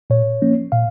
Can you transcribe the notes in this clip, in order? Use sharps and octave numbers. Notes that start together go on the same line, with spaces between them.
A#2 C#5
F3 A#3 C#4
A#2 F5